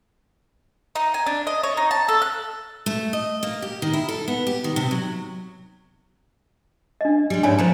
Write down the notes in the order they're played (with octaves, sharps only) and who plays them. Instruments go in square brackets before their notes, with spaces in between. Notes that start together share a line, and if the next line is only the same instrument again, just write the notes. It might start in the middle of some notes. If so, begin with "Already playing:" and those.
[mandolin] D#4
G#5
D4
D#5
C#5
D#4
A5
A4
F#6
[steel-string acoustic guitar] A3
D#5
A#3
G4
D#3
E4
A4
B3
G4
D#3
C3
F#3
[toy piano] D4 D#5
[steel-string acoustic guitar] G3 G#3
[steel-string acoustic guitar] G#2 C#4 E4 [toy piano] C#5 D5 G#5
[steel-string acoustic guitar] F3 F#3 B3 [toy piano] C5 A#5